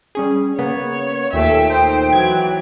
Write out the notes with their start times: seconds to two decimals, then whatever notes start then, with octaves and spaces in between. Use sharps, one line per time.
0.15 G3 C#4 G#4
0.58 C#3 A#3 B3 C#5
1.33 D#2 A#2 A3 A4 E5 G5
1.70 D#4 C5
2.13 E3 F#3 G#6